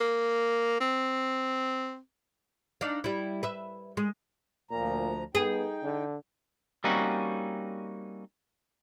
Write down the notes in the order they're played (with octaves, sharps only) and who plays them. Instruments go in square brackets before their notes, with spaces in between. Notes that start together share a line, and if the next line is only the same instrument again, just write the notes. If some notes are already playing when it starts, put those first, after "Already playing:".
[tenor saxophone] A#3
C4
[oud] D4 D#4 F5
G3 E4
B4 E5
G#3
[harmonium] D2 F3 A#5 [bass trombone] A#2
[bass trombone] B3 [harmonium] D#4 G5 [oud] G#4
[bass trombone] D3
[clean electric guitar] G3 A#3 C4 C#4 D#4 F#4